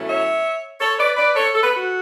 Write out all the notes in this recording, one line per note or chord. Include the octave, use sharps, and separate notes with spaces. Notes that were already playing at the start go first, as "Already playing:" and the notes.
Already playing: B2 F#3 A3 C#4 E4
C#5 E5
A4 C#5
B4 D5
B4 D5
A4 C#5
A4
B4
F#4 A4